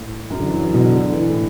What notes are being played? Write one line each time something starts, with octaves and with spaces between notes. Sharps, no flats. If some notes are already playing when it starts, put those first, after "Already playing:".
Already playing: A2
F#2
D3
E3
F#3
E3
B2
D3
D3
E3
A2